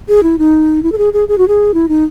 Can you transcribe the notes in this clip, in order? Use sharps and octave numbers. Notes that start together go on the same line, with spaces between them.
G#4
E4
D#4
E4
A4
G#4
G#4
G#4
F#4
G#4
E4
D#4